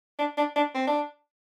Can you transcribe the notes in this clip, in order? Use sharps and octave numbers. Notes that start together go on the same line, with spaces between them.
D4
D4
D4
C4
D4